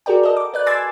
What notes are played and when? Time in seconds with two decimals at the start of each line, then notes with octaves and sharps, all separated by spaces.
0.06 F#4 G#4 A#4 D5 G5
0.23 A4 A#4 D#5
0.37 D6
0.54 B4 D5 F#6
0.66 G#5 C6 D6 E6 G#6 A6